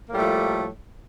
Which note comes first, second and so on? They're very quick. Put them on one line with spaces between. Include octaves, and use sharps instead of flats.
A#3 A2 G3 A3 F3